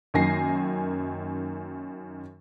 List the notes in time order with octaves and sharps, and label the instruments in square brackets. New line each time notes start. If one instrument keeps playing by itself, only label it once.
[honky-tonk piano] F#2 D#3 A#3 G#5 A#6 C7